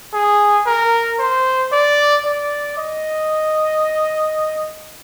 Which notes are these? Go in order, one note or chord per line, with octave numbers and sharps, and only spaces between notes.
G#4
A#4
C5
D5
D5
D#5